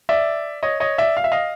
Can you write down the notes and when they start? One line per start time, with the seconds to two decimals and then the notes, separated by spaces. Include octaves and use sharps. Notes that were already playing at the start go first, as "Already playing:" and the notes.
0.09 D5 E5
0.63 C#5 D#5
0.80 C#5 D#5
0.98 D5 E5
1.17 F5
1.24 E5
1.32 D#5 F5